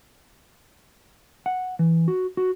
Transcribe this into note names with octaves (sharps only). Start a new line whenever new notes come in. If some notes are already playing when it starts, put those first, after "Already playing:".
F#5
E3
F#4
F#4